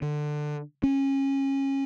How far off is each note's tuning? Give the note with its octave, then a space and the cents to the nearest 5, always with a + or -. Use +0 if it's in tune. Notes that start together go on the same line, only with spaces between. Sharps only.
D3 +20
C#4 -25